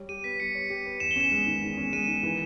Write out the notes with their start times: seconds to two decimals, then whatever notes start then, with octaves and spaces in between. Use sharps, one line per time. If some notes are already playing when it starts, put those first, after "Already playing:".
Already playing: G3 C#5
0.09 G4 D#7
0.24 B3 B6
0.40 G3 C#7
0.55 C#5
0.70 G4
0.85 B3
1.00 E2 E7
1.11 G7
1.16 C#4 E7
1.32 G#3
1.46 D#3
1.62 E2
1.77 C#4
1.93 G#3 D#7
2.08 D#3
2.23 E3